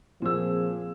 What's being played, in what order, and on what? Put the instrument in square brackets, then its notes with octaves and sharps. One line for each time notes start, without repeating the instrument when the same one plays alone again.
[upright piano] A#2 E6 [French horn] F3 [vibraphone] C4 G#4